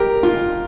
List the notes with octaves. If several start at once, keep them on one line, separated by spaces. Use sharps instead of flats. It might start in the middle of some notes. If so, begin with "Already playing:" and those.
Already playing: G3 G4 A#4
F4